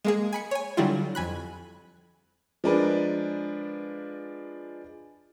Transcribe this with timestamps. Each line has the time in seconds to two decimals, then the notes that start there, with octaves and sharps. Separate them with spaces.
0.05 G#3 A#3 G#4
0.33 G#5 B5 C#7
0.51 C#5 G#5
0.77 D3 F#3 G3 E4 F4
1.15 F2 G#5 B5 F#6
2.64 F3 G#3 D4 A#4 B4